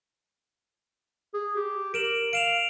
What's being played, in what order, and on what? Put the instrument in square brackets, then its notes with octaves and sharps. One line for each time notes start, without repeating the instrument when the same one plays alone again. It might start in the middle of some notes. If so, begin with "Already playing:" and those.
[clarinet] G#4
G4
[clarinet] A#4 [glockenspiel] D7 E7 F#7
[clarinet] F5 [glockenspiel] D7 E7 F7